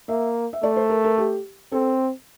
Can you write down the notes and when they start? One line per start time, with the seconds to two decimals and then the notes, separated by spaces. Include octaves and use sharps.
0.09 A#3 E5
0.53 E5
0.63 A3 D5
0.76 C5
0.89 A#4
1.04 A#4
1.18 G4
1.72 C4 A4